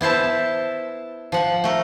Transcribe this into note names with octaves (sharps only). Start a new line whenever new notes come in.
B3 E4 C5 A5
F3 F#5
A3 A#4